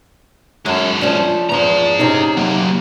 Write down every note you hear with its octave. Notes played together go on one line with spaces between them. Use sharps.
F#2 G#3 A4
F3 C#4 D4
E2 F3 G#4 A#5
C3 C#4 D#4
F#3 A#3